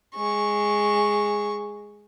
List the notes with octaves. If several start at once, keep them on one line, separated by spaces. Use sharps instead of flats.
G#3 C#6